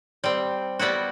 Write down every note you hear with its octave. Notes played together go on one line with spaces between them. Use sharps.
G3 C4
G3 B3 E4 F#4